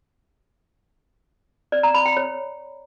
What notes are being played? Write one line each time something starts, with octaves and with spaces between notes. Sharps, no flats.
D5
A#5
B5
G5
C#5